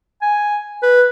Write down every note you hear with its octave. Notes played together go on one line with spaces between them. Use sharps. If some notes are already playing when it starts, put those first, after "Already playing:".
G#5
B4